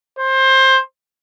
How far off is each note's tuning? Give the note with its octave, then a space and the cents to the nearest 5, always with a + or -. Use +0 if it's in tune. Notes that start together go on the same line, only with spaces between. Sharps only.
C5 +20